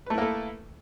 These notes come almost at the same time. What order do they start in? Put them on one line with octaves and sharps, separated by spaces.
B4 A3 E4 A#3 A4